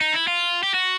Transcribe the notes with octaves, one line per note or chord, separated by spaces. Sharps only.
D#4
E4
F4
G4
F#4